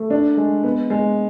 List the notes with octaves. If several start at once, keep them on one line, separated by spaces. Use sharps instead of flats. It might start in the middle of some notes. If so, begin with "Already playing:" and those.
Already playing: A3
D4
G#3
B3
G#3